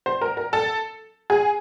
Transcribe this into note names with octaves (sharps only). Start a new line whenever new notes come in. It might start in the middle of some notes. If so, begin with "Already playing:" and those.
C5
A#4
A#4
A4
G#4